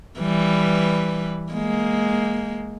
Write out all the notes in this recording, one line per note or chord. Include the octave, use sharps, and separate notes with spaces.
E3 G3 B4
G#3 A#3